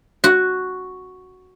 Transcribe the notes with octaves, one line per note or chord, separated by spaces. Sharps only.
F#4